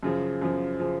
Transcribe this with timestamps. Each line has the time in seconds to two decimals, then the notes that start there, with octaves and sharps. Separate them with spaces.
0.03 F#2 C#3 F3
0.42 F#2 C#3 F3
0.80 C#3 F3